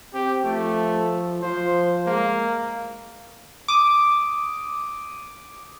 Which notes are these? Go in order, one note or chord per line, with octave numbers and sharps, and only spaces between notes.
C4 G4
F3 A3
F3 C5
G#3 A#3
D6 D#6